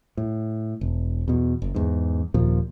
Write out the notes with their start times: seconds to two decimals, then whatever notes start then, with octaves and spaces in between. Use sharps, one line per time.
0.17 A2
0.81 E1
1.28 E2 B2
1.62 F#1
1.75 E2 G#2
2.34 D#1 D#2 A#2 F3